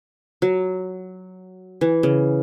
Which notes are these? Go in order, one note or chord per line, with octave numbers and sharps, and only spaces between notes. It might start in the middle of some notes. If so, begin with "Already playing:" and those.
F#3
E3
C#3